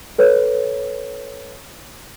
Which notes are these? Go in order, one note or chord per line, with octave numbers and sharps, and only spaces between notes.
A4 B4 C#5